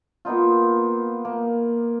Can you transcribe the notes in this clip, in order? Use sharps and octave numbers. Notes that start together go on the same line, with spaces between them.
A#3 B3 D#4 F4
A#3